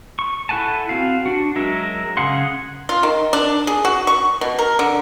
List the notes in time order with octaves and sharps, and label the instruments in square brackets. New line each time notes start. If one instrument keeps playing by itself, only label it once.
[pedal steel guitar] C#6
E4 A4 F#5 G#5 A5
C4 F#4 F5
D4 F#4
F#3 G#3 A#4 E5
C#3 G#4 F5 F#5 C6
[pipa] F4
D#3
D4
G#4
F#4
C#6
B2
A#4
D3